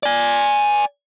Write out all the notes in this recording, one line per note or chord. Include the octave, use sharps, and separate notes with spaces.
D5 G#5